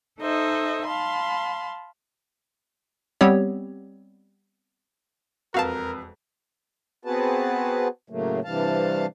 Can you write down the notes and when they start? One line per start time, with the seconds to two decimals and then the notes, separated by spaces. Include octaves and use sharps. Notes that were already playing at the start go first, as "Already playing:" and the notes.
0.22 D#4 A4 C5 D#5 E5
0.87 F5 A5 B5 C6
3.21 G3 B3 C4 G4 C#5
5.54 E1 F2 F#4 A#4 B4 F5 A5
7.05 B3 C4 F#4 G#4 B4 A5
8.10 A2 C#3 F#3 A3 A#3
8.44 G2 C3 E3 G3 F5 A5